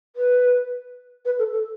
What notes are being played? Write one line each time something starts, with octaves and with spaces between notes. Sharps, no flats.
B4
B4
A4
A4